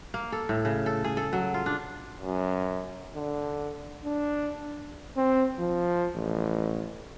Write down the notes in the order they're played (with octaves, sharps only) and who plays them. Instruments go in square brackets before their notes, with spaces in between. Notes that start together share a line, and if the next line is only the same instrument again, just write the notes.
[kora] A#3
A4
A2
C#3
A4
G#4
A4
F#3
F4
D4
[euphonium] F#2
D3
D4
[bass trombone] C4
F3
A1